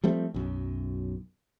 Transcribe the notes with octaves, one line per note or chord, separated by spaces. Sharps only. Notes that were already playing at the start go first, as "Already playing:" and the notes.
F3 G3 A3 C4
B1 F#2